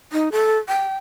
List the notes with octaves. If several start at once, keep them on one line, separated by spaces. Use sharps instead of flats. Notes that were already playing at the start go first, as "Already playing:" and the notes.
D#4
A4
G5